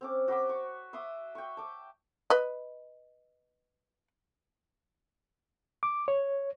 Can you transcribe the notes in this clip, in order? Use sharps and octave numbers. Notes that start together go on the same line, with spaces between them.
C4 C#4 D6
F#4 C5 B5 D6
C#6
E5 C6 D6 D#6
G5 C#6
A5 D6
B4 D#5
D6
C#5